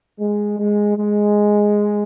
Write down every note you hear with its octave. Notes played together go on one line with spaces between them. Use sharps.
G#3
G#3
G#3